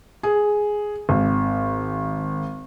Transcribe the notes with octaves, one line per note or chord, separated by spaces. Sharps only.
G#4
G#1